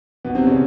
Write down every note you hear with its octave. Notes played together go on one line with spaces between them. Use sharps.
B2 B3
C3 C4
C#3 C#4